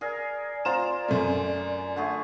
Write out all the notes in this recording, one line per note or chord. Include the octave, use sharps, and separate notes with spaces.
G#4 A#4 D5
F4 C5 A#5 E7
F#2 A3
D3 A3 G#4